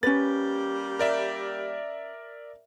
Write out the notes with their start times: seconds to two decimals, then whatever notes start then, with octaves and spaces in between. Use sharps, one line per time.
0.03 G3 A#3 C#4 G4 B4 A6
0.99 A#4 D5 E5